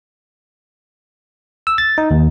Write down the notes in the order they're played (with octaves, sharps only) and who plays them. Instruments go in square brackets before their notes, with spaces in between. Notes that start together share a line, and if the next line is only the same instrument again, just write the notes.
[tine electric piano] E6
A6
D#4
D#2